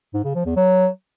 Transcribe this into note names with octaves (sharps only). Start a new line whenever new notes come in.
G#2
C#3
F3
E2
F#3